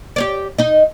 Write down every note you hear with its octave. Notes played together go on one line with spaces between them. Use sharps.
G4 C#5 D5
D#4 D#5